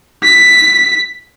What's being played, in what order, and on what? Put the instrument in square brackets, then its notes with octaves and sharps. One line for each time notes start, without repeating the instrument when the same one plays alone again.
[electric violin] B6